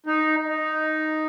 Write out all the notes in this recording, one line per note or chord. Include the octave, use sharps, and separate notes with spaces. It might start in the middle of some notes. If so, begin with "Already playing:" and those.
D#4
D#4